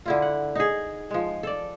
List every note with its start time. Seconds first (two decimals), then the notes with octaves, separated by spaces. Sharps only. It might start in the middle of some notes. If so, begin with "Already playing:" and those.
0.06 D3 E4 F4
0.22 F#5
0.55 D#4 G#4
1.11 F3 G#3
1.43 A4 D5